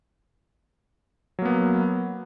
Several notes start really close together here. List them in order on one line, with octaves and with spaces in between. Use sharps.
F#3 A#3 B3